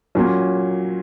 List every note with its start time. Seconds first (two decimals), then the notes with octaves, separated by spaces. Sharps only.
0.15 A#2 F#3 C#4